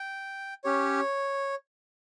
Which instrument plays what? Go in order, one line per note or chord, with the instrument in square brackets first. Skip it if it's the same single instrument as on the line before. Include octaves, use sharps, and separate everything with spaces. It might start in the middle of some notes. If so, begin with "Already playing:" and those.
Already playing: [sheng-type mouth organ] G5
C#4 G4 C#5